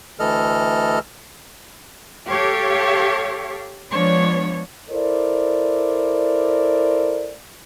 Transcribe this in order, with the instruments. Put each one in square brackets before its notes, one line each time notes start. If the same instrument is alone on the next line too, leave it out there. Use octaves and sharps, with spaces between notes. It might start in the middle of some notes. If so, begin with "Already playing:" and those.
[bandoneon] D2 E3 A4 D#5 F6
[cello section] G4 A4 C#5 F5
F3 G#3 B3 D4 C#5
[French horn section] E4 A4 A#4 C5 D5